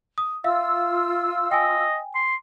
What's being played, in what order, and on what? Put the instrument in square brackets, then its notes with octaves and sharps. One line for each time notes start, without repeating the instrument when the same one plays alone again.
[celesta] D#6
[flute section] F4 E6 [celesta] E5 F5
[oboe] D#5 [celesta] G5 G#5
[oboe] C6